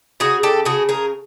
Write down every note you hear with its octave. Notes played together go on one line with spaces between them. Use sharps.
C#3 F#4 G#4
G4 A4
C#3 F#4 G#4
G#4 A#4